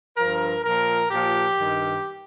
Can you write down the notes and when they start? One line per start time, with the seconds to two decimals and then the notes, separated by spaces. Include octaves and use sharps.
0.16 G2 F3 A#4
0.64 A#2 F3 A#4
1.10 A#2 F3 G4
1.58 G2 D#3